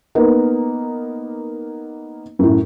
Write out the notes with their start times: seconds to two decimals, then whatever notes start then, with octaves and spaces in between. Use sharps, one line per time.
0.15 A#3 B3 D#4 A#4
2.39 F#2 A2